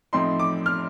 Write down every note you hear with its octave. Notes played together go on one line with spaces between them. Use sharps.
A2 F3 C4 D#4 C6
D6
F6